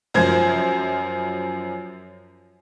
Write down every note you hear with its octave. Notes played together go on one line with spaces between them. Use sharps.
F#2 F3 C5 G#6